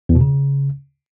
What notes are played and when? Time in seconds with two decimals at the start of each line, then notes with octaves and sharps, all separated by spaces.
0.09 E2
0.15 B2
0.21 C#3